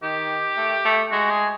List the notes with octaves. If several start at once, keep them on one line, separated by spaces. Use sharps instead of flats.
D#3 G4
A3
A3
G#3 F#4
G#4